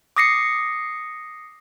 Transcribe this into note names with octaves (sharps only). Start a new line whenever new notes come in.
D6 D#6 A#6 C7 C#7